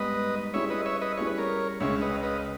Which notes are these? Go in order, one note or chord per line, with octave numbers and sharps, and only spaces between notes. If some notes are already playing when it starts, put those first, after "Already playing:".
Already playing: G#2 G3 B3 D#4 B4 D#5
G3 C#4 E4 G#4 C#5 E5
B4 D#5
C#5 E5
B4 D#5
G3 C#4 E4 G#4 C#5
B4
A#4 C#5
C#2 C#3 G#3 C#4 C#5 E5
B4 D#5
B4 D#5